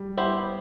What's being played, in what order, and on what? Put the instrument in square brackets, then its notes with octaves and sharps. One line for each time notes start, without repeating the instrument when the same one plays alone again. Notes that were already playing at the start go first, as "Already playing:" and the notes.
Already playing: [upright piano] G3
[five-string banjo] B3 E4 G4 C5